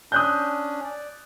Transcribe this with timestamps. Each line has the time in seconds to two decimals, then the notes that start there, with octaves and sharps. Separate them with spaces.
0.12 C#4 D4 D#6 F#6 G6
0.84 D5